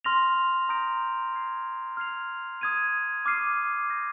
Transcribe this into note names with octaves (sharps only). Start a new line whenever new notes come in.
C6 F6 A#6 F7
A#5 D#6 G6 A#6 D7
F6 G#6 C7
F6 G#6 C7 F7
D#6 G#6 D#7
D6 F6 C7 D#7
G6 A#6 D#7